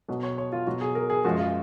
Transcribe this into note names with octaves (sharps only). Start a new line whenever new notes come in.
B2 F#3
C#5
C#5
F4
B2 F#3 F#4
G#4
A#4
G#4
F#2 F3 G#3 F#4
F4